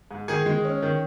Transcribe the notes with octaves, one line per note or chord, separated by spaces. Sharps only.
G#2
D#3 G#4 G#5
G#3
C#4
D#3